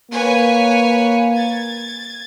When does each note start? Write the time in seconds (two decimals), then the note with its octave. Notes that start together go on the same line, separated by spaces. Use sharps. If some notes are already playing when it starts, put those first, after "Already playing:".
0.11 A#3 B4 C#5 G#5
1.34 G#6 A6